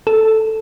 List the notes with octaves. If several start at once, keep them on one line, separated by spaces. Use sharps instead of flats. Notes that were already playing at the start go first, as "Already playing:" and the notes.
A4